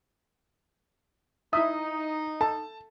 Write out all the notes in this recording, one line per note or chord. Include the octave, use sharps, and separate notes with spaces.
D#4 E4 E5 D#6
A4 A5